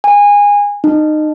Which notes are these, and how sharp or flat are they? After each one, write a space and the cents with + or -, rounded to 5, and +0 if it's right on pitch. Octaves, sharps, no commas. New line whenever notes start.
G#5 -20
D#4 -20